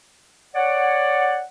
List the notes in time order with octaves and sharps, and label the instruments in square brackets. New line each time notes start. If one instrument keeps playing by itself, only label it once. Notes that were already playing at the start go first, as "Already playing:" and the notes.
[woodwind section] C#5 D5 F#5